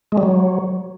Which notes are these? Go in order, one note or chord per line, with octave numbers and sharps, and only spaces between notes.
G#3
G3
F#3